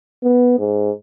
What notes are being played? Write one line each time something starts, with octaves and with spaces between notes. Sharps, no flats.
B3
G#2